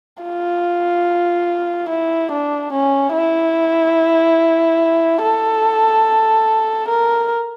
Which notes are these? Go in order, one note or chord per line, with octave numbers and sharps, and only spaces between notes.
F4
E4
D4
C#4
E4
A4
A#4